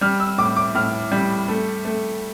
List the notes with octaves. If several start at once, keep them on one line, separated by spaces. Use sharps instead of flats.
G3 F6
E6
A2 D6
D6
A2 F6
G3
A3
A3